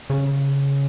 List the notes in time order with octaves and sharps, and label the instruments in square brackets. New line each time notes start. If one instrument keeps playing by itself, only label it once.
[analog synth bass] C#3